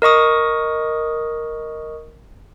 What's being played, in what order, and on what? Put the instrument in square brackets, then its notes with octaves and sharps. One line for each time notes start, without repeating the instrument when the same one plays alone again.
[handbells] A#4 D#5 C#6 D#6